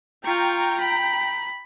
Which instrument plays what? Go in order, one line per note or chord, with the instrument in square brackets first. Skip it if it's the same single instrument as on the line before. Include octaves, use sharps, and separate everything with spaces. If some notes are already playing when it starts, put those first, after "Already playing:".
[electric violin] F4 C#6 [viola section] G5 A#5
[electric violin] B5